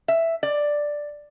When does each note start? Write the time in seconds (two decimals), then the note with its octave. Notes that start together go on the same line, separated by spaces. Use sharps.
0.08 E5
0.43 D5